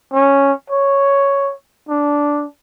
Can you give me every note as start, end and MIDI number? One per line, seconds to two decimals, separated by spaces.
0.13 0.52 61
0.70 1.52 73
1.89 2.44 62